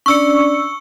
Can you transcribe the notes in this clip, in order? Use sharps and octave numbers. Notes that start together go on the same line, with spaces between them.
C#4 D4 D5 C#6 E6 C#7